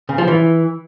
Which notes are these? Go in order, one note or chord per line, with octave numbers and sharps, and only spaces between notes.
C#3
F3
E3